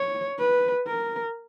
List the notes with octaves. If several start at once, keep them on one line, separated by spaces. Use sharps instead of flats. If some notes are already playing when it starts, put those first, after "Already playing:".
Already playing: C#5
B4
A#4